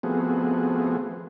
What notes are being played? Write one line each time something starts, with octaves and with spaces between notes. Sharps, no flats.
F3 A3 B3 C4 F#4 G#4